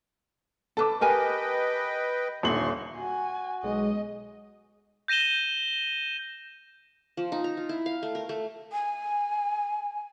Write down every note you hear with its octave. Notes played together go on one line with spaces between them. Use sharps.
A4 B4 A5 D6
G4 A#4 B4 D#5 G5 G#5
D#1 D3 C6 C#6 F#7
F#4 G#5
B1 G#3 D#5
G6 A#6 D#7 E7 G7
F3
D#4
A#5
F4
E4
F5
A3
A#4
A3
G#5